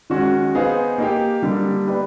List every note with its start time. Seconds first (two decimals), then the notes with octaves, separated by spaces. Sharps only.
0.10 D#3 G#3 C#4 F#4
0.55 B3 D#4 G#4 C5 F5
0.98 A#3 D#4 G4
1.42 D3 G3 A#3 D4
1.86 B3 D#4 G4 B4 D5